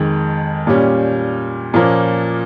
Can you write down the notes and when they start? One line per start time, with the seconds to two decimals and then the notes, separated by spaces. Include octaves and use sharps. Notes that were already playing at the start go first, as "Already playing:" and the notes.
Already playing: F2 D#3 G#3
0.67 A#2 G3 C#4
1.74 A#2 F3 A#3 C#4